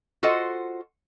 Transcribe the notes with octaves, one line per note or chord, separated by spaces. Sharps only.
F4 F#4 A4 C5 D#5 F#5